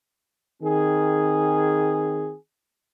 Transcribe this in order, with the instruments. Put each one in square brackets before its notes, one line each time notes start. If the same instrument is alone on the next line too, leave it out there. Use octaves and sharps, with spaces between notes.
[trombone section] D#3 C4 G#4